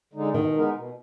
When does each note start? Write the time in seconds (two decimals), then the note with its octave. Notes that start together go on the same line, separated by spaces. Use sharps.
0.13 D3 G#3 D#4
0.34 B2 D#3
0.54 G#3 B3 D#4 A#4
0.74 B2